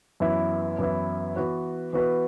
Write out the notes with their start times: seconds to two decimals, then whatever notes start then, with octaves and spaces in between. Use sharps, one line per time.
0.20 F#2 E3 B3 E4
0.78 F#2 E3 B3 E4
1.36 E3 B3 F#4 B4
1.93 E3 B3 F#4 B4